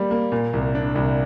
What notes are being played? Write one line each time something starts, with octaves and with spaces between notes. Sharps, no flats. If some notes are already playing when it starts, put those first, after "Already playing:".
Already playing: G3 A#3
A#3
A#2
C2
D4
C2